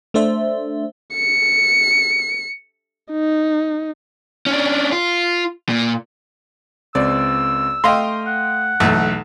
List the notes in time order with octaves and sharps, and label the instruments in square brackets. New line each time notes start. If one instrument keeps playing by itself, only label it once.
[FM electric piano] A3 D4 C5 E5
[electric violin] C#7
D#4
[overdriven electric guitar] C#4 D4
F4
A#2
[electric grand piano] C#2 C4 [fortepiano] D5 [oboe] E6
[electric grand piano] A3 G5 [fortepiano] D#5 F5 C6
[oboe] F#5
[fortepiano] B1 E2 A3